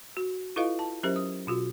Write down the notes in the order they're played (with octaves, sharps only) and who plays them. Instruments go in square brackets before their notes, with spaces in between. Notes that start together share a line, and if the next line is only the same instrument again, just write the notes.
[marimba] F#4
E4 F4 A4 B4 D#5 F5
A5
F#3 C#4 G4 A#4 C5 E5
D#6
B2 F4 F#4